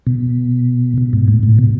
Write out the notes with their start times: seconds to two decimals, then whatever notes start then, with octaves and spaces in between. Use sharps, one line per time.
0.07 B2
0.98 B2
1.13 G#2
1.28 A2
1.43 A2
1.59 B2